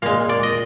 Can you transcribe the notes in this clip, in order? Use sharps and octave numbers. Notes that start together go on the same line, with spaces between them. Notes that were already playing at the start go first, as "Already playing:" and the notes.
A#2 G#3 F5
D5
D#5